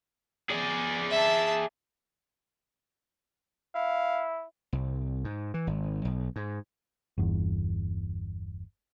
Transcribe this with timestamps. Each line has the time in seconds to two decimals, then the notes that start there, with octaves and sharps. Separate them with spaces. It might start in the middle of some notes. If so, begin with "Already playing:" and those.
0.50 G#4 D5
1.10 E5 A5
3.75 E4 F5
4.73 C2
5.24 G#2
5.54 E3
5.67 G#1
6.05 B1
6.36 G#2
7.18 G1 E2